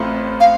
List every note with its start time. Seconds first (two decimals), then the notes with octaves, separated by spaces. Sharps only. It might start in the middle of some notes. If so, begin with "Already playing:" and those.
Already playing: A1 A2 A3 C4 F4
0.40 F5